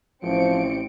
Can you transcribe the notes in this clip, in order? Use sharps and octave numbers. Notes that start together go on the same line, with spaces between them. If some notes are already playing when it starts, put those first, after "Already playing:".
A1 F3 C4 C#7 D7